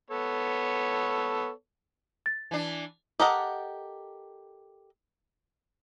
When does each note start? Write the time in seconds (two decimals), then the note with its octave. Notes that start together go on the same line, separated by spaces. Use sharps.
0.10 B3 A4 C#5
2.26 A6
2.51 E3 D4
3.20 G4 A4 A#4 D#5 F#5